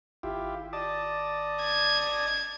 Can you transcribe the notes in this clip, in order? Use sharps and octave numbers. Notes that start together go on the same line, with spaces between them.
G#1 E4 F4 G4
D5 D#5 A5
G#6